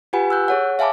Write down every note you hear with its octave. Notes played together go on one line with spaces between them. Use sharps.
F4 G4 B4 F#5 G#5 B5
E6 F#6 G6
G#4 C#5 F#5
E5 F5 G#5 A5 B5 D6